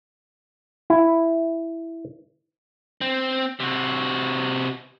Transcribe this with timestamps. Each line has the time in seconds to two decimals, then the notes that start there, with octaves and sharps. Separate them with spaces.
0.90 E4
3.01 C4
3.60 C3 F#4